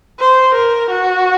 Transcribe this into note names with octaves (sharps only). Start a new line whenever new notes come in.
C5
A#4
F#4